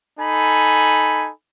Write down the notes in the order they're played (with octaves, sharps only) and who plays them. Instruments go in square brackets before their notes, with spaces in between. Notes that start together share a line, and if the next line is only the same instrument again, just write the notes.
[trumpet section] D#4 A4 G#5 B5